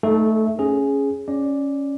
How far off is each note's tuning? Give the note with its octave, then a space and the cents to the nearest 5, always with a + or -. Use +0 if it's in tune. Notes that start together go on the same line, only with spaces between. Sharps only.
A3 +0 D#4 +0 A4 -30
C#4 +0 G#4 +0
C#4 +0 D5 +0